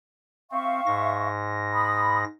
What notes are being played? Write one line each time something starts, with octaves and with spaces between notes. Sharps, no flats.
C4 E5 F5 C#6
G#2 A#6
B5 D#6